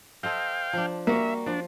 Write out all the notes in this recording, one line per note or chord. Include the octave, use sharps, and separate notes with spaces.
A4 C5 D#5 F5 G5
F3 D4
G3 A#3 F#4 E5
F3 D4